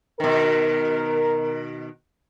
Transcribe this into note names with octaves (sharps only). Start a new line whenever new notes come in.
B2 D#3 A#4